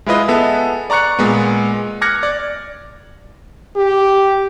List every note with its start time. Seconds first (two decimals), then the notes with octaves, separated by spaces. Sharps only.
0.06 G#3 E4 F4 B4 D#5
0.28 B3 G#4 A4 E5
0.90 D5 A#5 C#6 F#6 C#7
1.19 A#2 G#3 B3
2.01 D6 F6 F#6 G#6 A#6 C#7
2.23 D5
3.76 G4